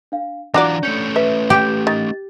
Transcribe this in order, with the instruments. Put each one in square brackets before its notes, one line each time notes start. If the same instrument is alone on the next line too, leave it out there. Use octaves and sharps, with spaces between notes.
[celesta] D4 F5
[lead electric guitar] E3 F4 [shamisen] D4 F#4 D5 [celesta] A#5 A#6
[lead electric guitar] A3 C#4 [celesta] G6 C#7
[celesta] B4 [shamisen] E5
[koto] G4
[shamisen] D#3 [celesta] A6